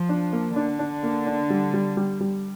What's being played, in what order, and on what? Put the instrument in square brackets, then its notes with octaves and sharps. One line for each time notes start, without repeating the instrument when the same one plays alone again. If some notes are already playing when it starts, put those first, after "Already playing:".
Already playing: [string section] F3
[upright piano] D4
A#3
[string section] D3 [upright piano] D4
[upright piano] D4
A#3
D4
G3
G3
G3
G3